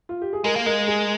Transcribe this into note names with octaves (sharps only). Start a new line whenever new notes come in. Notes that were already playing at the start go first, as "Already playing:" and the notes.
F4
G4
G#4
G#3 A#4
A#3
G#3 A#4
G#4